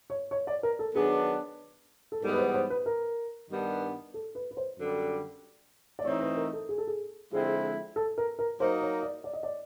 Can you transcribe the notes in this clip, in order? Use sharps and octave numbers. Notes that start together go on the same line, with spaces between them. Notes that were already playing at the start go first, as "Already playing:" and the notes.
C#5
C#5
D5
A#4
A4
D#3 F#3 B3 D4 G#4
A4
G#2 E3 G3 B3 D#4 A#4
B4
C5
C5
B4
A#4
G2 D#3 G3 B3 D4
A4
B4
B4
C5
F#2 D3 G3
D5
E3 A3 C4 D#4 C#5
B4
A#4
A4
G#4
A4
G#4
D3 F3 G#3 C4 E4 G#4
A4
A#4
A#4
F#3 A#3 D#4 C5
C#5
D5
D5
D#5
D5